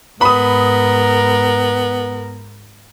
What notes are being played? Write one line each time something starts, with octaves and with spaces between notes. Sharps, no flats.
G#2 B3 A#4 B5 D#6